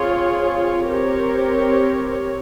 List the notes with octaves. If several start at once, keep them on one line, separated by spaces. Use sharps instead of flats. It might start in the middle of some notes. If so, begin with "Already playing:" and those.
Already playing: C4 F4 G#4 C#5
C4 G4 A#4 C#5